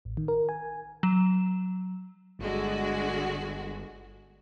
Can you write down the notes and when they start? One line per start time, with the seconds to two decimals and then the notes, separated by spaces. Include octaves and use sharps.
0.05 A1
0.17 D#3
0.28 A#4
0.49 G#5
1.03 F#3 E7
2.39 G1 D3 G#3 F#4